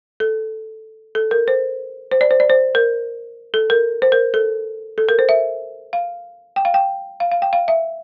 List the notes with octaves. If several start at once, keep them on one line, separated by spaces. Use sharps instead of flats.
A4
A4
A#4
C5
C5
D5
C5
D5
C5
A#4
A4
A#4
C5
A#4
A4
A4
A#4
C5
E5
F5
G5
F5
G5
F5
F5
G5
F5
E5